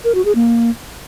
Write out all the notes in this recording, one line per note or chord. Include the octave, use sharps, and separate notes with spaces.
A#4
F#4
G#4
A#3